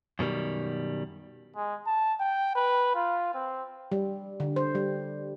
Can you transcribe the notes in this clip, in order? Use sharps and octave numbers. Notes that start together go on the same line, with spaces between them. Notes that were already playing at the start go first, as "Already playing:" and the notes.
F#2 B2 D#3 G3
G#3
A5
G5
B4
F4
C4
G3
D3
C5
G3